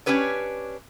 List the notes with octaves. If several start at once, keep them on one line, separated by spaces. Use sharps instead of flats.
C#4 D4 G4 B4 C#5